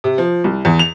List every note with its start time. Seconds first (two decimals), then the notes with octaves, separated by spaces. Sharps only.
0.04 C3
0.18 F3
0.44 C2
0.65 E2
0.79 F7